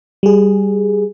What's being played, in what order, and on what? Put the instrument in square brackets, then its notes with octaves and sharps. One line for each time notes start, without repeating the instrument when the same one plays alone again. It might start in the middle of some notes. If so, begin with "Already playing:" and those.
[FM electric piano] G3 G#4